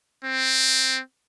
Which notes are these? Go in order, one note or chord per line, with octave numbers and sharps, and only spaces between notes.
C4